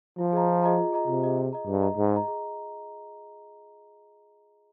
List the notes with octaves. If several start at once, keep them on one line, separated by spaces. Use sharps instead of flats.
F3 F4
G#4 D#5 A#5
F4
G#4 D#5 A#5
F4
G#4 D#5 A#5
C3 F4
G#4 D#5 A#5
G#4
D#5 A#5
G2 G#4
D#5 A#5
G#2 G#4
D#5 A#5
G#4